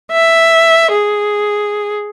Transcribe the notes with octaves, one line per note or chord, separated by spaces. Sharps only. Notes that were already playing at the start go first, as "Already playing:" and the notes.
E5
G#4